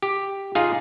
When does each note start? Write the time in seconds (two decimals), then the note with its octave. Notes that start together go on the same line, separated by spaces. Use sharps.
0.02 G4
0.55 D#4 F4 G#4 F5